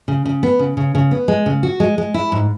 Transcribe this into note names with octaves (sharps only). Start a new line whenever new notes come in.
C#3
C#3
B3
C#3
C#3
C#3
B3
G#3
C#3
F#4
G#3
G#3
E4
G#2